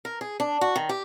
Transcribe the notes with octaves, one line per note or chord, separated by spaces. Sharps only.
A#4
G#4
D4
F#4
D#3
G4